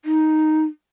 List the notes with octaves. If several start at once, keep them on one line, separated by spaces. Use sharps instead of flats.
D#4